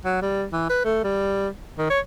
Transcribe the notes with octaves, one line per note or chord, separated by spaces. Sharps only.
F#3
G3
E3
B4
A3
G3
D#3
C#5